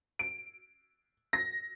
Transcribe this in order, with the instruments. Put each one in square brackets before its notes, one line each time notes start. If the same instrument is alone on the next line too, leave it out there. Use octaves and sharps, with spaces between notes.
[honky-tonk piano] D7
A#6